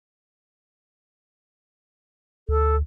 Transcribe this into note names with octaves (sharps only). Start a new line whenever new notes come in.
D2 A4